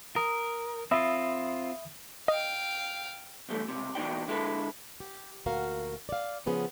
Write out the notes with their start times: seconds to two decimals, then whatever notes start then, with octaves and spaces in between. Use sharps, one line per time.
0.16 A#4 D#6
0.91 C4 F4 E5 B5 D#6
2.28 D#5 F5 G5
3.49 B1 E2 G3 A3
3.68 C#2 G2 C3
3.95 E2 B2 C4 D#4 D5 G5
4.27 D3 G#3 E4 G4 A4 B4
5.00 G4
5.46 D2 A#2 F#4 A#4 F5
6.09 D5 F5
6.46 C#3 F3 B3 C#4 G#4